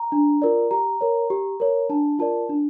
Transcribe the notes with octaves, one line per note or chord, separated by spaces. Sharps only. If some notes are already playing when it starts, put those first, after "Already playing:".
Already playing: A#5
D4
F4 A#4 D5
G4 A#5
A#4 C#5
G4
A#4 C#5
D4 A5
F4 A#4 D5 A5
D4